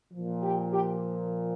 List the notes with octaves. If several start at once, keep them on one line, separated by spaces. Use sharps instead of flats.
A#2 F3
G4
G4